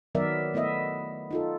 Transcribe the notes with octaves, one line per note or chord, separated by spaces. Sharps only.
D#3 F#3 B3 A#4 D5 E5
A3 B3 E4 D#5 E5
D#4 F4 A4